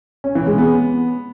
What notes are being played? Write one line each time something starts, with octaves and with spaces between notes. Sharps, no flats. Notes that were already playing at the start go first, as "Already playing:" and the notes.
C#4
E3
G#3
B3